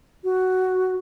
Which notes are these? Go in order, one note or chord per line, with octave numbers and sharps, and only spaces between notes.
F#4